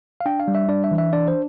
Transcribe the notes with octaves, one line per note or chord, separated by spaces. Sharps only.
F5
D4 G5
F5
G3
E5
D4 D5
E5
E3
E5
D4 D5
C5